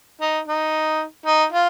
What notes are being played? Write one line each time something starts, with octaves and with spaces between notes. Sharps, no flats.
D#4
D#4
D#4
F4